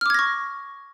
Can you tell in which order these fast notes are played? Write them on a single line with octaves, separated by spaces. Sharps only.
F6 D6 G#6 A#6 C#6